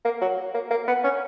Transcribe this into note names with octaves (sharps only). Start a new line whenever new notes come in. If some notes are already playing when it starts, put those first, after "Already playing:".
A#3
F#3
A#3
A#3
B3
C#4